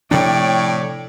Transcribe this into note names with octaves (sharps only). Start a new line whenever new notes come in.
A2 C3 F3 D4 C#5 D5 G5